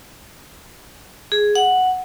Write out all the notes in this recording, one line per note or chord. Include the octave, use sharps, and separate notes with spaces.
G#4
F#5